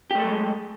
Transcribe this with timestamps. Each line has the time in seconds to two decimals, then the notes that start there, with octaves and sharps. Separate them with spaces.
0.11 G4
0.15 A3
0.20 A4
0.24 F#3
0.28 G#3